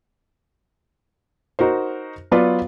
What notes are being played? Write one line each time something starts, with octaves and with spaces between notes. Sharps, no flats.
D#4 F#4 A#4 C5
F#3 B3 F4 B4 D5